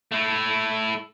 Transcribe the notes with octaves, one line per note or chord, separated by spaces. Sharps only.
A3 E4